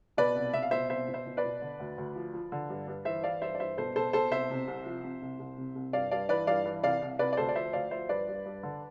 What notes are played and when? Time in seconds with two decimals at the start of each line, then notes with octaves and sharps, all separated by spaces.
0.17 B2 B4 D5
0.36 C2
0.53 B2 E5
0.62 F5
0.71 B2 C5 E5
0.90 C2 C5 E5
1.08 B2
1.13 C5 E5
1.26 B2
1.37 B4 D5
1.44 B2
1.61 D3
1.80 D2
1.98 D2
2.16 F3
2.34 F3
2.52 D3
2.70 G2
2.87 G2
3.05 E3 C5 E5
3.24 E3 D5 F5
3.42 G2 C5 E5
3.55 D5
3.60 G2 C5 E5
3.77 B2 A4 C5
3.95 B2 A4 C5
4.13 B2 A4 C5
4.31 C2 C5 E5
4.50 C3
4.67 C2
4.86 F3
5.04 C3
5.22 C2
5.39 C2
5.57 C3
5.75 C2
5.93 G2 D5 F5
6.11 G2 D5 F5
6.29 E3 B4 D5
6.47 G2 D5 F5
6.65 E3
6.83 C2 D5 F5
7.02 C2
7.19 C2 B4 D5
7.33 D5
7.37 D2 A4 C5
7.49 D5
7.55 F3 C5 E5
7.73 D2 D5 F5
7.91 F3 C5 E5
8.09 G2 B4 D5
8.28 G2
8.46 G2
8.63 D3